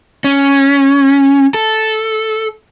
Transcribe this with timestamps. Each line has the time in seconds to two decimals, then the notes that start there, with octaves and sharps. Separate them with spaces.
0.24 C#4
1.54 A4